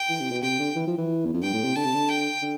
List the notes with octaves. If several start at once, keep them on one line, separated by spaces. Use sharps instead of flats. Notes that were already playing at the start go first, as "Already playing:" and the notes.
Already playing: G5
E3
C3
B2
C3 G5
D3
E3
F3
E3
E2
F2
G2 G5
A2
C3
D3 A5
C3
D3
G5
D3